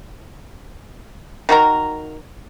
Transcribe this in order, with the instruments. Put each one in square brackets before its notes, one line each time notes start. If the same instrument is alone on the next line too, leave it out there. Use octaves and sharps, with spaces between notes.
[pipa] D#3 F#4 A#4 A#5